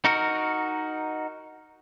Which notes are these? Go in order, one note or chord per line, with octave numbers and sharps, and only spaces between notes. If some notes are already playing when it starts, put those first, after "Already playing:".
D#4 F#4 A#4